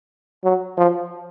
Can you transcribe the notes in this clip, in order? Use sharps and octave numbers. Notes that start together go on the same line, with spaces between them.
F#3
F3